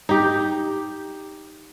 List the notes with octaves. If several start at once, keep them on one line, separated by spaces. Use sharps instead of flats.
D#4 G4